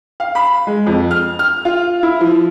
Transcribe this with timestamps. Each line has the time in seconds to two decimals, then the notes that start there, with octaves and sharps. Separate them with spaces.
0.20 F5
0.35 B5
0.67 G#3
0.86 F2
1.11 F6
1.39 F6
1.65 F4
2.03 E4
2.21 F3